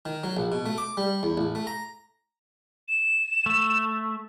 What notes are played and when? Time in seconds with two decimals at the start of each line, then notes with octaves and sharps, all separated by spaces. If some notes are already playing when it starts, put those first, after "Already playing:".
0.05 D#3
0.24 F#3
0.37 A#1
0.52 B2
0.66 A3
0.78 D6
0.97 G3
1.23 E2
1.37 A1
1.55 A3
1.67 A#5
2.88 E7
3.46 A3